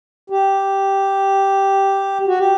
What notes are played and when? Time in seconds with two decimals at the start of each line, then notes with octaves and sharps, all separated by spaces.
0.30 G4
2.27 F#4
2.38 G4